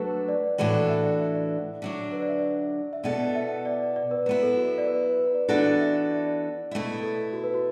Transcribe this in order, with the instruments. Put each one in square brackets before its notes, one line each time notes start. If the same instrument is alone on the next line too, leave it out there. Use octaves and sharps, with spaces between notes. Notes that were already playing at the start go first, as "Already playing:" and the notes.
Already playing: [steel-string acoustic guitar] F#3 A3 D4 F#4 A4 [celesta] B4
[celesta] D5
[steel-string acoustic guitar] A2 E3 D4 F#4 A4 [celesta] D5
[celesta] E5
D5
E5
D5
[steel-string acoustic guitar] D3 F#3 D4
[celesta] B4
D5
E5
D5
E5
[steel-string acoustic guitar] B2 B3 E4 A4 [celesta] D5
[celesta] E5
D5
D5
B4
[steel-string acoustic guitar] F#3 B3 E4 [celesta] B4
[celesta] A4
F#4
A4
D5
B4
B4
B4
D5
[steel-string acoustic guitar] E3 B3 D4 F#4 A4 [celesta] D5
[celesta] D5
D5
E5
D5
[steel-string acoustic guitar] B2 A3 E4
[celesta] A4
F#4
B4
F#4